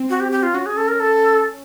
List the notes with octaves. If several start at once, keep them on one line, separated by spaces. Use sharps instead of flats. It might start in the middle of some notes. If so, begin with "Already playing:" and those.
Already playing: C4
F#4
G4
G4
F4
C#4 F#4
G#4
A4
A#4
A4